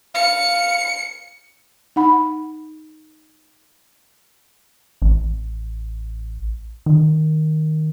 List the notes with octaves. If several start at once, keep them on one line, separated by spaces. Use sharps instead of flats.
F5 C#7
D#4 F#5 B5
A1
D#3